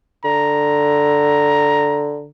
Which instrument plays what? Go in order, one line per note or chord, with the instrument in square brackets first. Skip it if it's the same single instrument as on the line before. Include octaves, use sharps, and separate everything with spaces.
[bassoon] D3 [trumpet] A#5